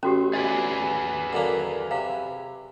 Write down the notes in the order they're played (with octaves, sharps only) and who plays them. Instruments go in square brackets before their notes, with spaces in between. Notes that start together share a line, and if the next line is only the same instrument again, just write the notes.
[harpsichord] A1 [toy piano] C#4 F#4 G4
[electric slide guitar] G#4 B4 D5 [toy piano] D#5
[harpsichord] F#2 D3 A#3
[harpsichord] C3 [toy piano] F5